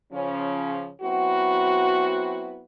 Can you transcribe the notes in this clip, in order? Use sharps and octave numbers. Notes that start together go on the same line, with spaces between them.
C#3 F3 C#4
F#3 B3 C4 E4 F#4